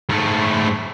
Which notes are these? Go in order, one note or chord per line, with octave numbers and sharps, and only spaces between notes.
G#2 A3